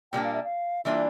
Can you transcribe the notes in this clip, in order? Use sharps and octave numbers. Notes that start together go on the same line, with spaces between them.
A#2 G3 A#3 D4 G5
F5
E5
F5
E3 G3 A#3 D4 F4 E5